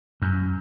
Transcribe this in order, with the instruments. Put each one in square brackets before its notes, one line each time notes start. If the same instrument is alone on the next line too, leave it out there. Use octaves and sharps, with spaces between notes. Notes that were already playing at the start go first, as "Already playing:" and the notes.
[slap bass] F#2